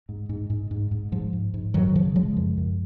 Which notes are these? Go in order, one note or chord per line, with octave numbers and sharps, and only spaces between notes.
G#2
G#2
G#2
G#2
G#2
G#2 F3
G#2
G#2
F#2 D#3 F#3
C#3 F3
C#3 F3 G#3
F#2
F#2